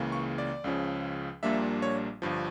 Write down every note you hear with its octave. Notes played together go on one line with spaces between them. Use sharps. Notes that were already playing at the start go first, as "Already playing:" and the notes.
Already playing: C#2 C#3 E3 A#3
C#6
D5
C#2 C#3 F3 C#4
A#1 A#2 G3 A#3 D4 E5
C#5
G1 G2 F3